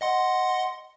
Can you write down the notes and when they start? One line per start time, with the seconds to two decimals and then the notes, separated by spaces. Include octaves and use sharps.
0.01 D#5 F#5 C6